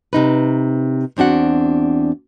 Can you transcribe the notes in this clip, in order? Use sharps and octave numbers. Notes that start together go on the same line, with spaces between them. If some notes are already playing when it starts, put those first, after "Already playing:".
C3 D#4 B4
E2 C4 D4 F#4 F#5